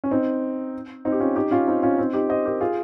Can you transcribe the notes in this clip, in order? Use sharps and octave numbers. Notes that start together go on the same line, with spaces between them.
C#4
C4 D#4
C4 D#4
G4
C#4 F4
D#4 G4
C#4 F4
C4 D#4
C#4 F4
C4 D#4
D#4 G4
C5 D#5
G4 A#4
F4 G#4